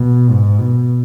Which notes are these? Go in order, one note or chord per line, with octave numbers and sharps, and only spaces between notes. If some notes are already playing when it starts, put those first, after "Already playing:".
Already playing: B2
G#2
B2